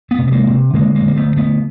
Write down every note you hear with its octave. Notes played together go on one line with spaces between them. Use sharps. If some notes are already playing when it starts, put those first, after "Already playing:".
A3 B3
C3
B3
G#3 A#3
C3
D3 G#3 A#3
G#3 A#3
D3
A#3
A3 B3
G2
A3 B3